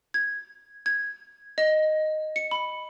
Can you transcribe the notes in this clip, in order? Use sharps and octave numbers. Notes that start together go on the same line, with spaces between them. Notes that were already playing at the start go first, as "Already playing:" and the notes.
G#6
G#6
D#5
C#7
B5